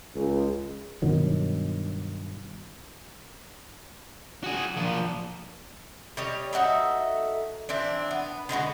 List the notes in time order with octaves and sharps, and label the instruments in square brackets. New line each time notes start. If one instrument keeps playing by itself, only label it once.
[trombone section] C#2
[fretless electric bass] G2 B2 D#3 F#3
[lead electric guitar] F#4 G#4
A#2 F3
[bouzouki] G3 C#5 D#5
D#4 F#4 A4 E5
E3 C4 D4
B3
D3 G#3 B3 F#4